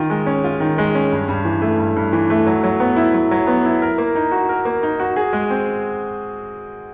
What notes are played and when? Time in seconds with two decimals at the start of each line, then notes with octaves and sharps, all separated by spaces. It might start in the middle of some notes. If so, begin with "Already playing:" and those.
Already playing: D#3 F4
0.10 G#3
0.26 C#4
0.44 F4
0.60 D#3
0.78 G#3
0.95 C#4
1.12 G2
1.29 G2
1.45 E3
1.62 A3
1.79 G2
1.96 G2
2.13 E3
2.30 A3
2.47 F#3
2.64 F#3
2.80 B3
2.96 E4
3.14 F#3
3.31 F#3
3.47 B3
3.65 E4
3.82 A#4
3.98 A#3
4.15 D#4
4.32 F#4
4.49 A#4
4.65 A#3
4.83 D#4
5.00 F#4
5.16 G#4
5.33 G#3
5.50 C4